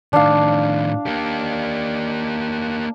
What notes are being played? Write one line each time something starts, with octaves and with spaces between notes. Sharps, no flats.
A2 D#3 D4 F5
A#3 G4